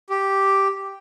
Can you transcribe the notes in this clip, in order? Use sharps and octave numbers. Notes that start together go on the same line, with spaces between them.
G4